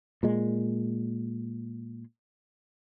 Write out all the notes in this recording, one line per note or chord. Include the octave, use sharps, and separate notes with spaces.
A#2 G#3